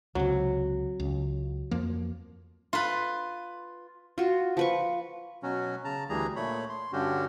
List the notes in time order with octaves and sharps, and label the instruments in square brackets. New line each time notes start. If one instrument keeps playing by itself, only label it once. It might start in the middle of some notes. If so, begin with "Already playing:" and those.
[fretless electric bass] C#2 C3 [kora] F#3
[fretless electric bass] C#2
F2 F3 A#3
[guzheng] F4 B4
[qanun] F4 F#4
F3 B4 C#6
[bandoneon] B2 F#3 C#4 F#4
C#3 A5 A#5
D2 E3 G3 G#4 A#5
A#2 A3 C#5 B5
C6
G2 D3 C#4 F#4 G4